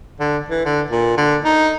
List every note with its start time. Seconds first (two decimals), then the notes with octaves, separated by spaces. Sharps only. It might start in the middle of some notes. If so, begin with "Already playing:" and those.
0.20 D3
0.50 E3
0.66 D3
0.90 A#2
1.17 D3
1.45 D#4